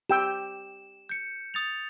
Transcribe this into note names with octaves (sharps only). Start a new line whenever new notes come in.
G4 G5 E6 E7
G6 C#7
D#6 A6 F7